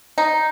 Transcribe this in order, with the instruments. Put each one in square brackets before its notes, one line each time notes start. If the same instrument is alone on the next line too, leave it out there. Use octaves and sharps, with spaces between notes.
[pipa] D#4